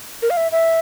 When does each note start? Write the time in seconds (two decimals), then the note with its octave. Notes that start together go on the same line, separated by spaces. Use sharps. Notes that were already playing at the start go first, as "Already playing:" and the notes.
0.22 A#4
0.30 F5
0.37 E5
0.52 E5